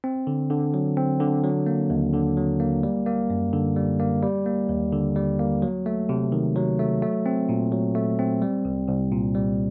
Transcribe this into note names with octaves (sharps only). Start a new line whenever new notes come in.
C4
D3
D3
F#3
C4
D3
F#3
A#3
D#2
D3
F#3
A#3
G3
A#3
F#2
D3
G3
A#3
G3
A#3
D#2
D3
G3
A#3
F#3
A3
C3
D#3
F#3
A3
A3
C4
A#2
F#3
A3
C4
G3
C2
C2
A#2
G3